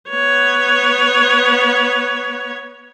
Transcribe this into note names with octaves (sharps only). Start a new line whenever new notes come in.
B3 C#5